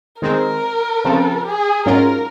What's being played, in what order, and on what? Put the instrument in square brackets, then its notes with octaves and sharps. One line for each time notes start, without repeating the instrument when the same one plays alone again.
[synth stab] D#3 G#3 C4 [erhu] A#4
[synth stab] C#3 F3 C4
[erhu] G#4
[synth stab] G#2 F#3 C#4 F4 [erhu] A#4